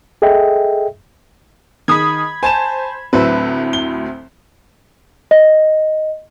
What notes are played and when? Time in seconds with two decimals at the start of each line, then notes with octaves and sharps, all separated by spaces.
0.22 G#4 A4 D#5 E5 G5
1.88 D#3 G#4 B5 D#6 G#6
2.43 C5 G#5 A5 E7
3.13 D2 A2 F#3 C4 B4 E5
3.73 G7
5.31 D#5